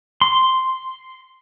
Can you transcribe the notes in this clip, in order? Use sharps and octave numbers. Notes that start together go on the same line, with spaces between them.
C6